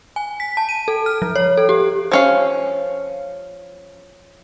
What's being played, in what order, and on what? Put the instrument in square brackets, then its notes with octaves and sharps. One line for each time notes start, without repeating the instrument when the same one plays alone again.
[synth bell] G#5
B6
A5
D#7
A4
F6
F3
C#5
A4
G4
[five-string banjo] F3 C#4 F5